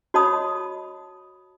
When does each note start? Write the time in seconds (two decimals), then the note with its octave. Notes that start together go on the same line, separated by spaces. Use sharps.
0.14 F#4 C#5 D#5 A5 B5 D#6